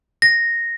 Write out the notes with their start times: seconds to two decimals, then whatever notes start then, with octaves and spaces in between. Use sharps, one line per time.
0.22 A#6